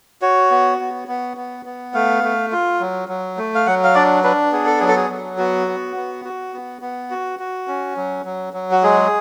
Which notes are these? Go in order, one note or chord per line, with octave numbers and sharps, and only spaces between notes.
F#4 C#5
B3
B3
B3
B3
B3
A3 F5
A3
F4
F#3
F#3
A3
F5
F#3 F#5
F5
D4 D5
D4 B4
B3 G#4
A4
F#3 G#4
A4
G#4
F#3
B3 F#4
B3
B3
F#4
B3
B3
F#4
F#4
C#4
F#3
F#3
F#3
F#4
G#3 G#4